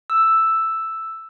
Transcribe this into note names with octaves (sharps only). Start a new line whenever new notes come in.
E6